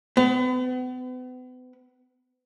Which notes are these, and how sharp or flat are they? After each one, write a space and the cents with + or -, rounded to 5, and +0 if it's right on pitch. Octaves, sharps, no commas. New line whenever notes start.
B3 +40